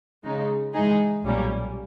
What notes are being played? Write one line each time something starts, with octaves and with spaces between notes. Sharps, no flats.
C#3 G#3 D#4
G#2 E3 G#3 D#4 G#4
B1 A#2 G3 A#3 C#4